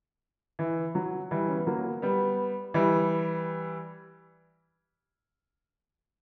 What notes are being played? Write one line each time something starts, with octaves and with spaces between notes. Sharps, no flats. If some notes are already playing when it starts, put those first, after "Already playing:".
E3
F#3
E3 G3
C#4
B3
F#3 A#3
G3 B3
E3 G3